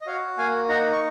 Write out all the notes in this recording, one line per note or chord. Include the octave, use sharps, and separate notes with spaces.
D#5
F#4 C#5 F5
A#3 F5 G#5
D#4 F#5 A#5
C#6